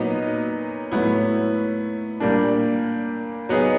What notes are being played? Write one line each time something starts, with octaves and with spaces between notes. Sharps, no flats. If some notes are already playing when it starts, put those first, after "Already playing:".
Already playing: A#2 F#3 B3 D#4
A2 F#3 B3 E4
A#2 G3 A#3 D4
F#3 B3 D#4 G#4